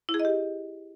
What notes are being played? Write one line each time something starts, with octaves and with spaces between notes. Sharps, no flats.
E4
G#4
D#5
G4